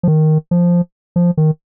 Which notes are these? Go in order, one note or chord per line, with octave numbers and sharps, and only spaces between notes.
F3
D#3
F3
F3
D#3